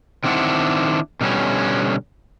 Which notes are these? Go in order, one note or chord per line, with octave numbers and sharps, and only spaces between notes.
D#3 C4 D4 E4 F#5
B2 D3 G3 C#4